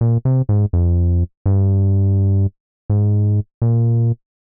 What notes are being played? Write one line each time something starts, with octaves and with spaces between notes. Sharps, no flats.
A#2
C3
G#2
F2
G2
G#2
A#2